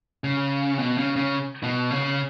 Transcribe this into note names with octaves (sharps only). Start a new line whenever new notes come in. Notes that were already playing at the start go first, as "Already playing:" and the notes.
C#3
B2
C#3
C#3
B2
C#3